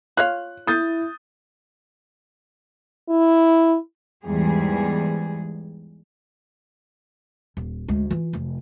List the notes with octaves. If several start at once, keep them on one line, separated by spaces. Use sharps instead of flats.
F4 C#5 F5 F#6
E4 D#6 G6 A6
E4
E2 G#2 G3 G#4
D#1
D2 G#3
E3 F4
F1 F2